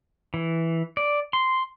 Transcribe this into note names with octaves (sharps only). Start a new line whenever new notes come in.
E3
D5
C6